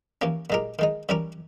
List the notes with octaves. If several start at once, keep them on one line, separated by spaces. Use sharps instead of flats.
E3 A#3 C#4 G4
A#2 G#3 D#4 G4 A#4
D#3 G#3 D#4
E3 G3 C#4 G4 A#4